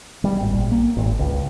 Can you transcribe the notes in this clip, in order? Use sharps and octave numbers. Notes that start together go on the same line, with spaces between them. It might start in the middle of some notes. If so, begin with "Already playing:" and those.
G3
G#1
A#1
A#3
G#1
C#2